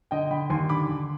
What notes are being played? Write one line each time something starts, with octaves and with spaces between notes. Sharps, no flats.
D3 D#5 G5
D3 G5 B5
D#2 G#5 C6
D3 B5 D6
D3